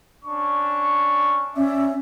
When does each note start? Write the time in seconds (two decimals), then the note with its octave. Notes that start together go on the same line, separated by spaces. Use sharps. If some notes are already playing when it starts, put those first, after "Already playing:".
0.25 C#4 D4 C#6
1.57 C#4 C#5 D5 E5